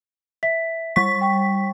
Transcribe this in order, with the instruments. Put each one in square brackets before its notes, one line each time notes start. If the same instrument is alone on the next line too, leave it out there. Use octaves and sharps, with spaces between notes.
[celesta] E5 B6
[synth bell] G3 B6 [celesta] C#6
[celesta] G5 C#6